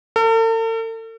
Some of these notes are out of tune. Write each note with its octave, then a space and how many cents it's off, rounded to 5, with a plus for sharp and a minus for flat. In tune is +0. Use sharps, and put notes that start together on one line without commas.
A4 +45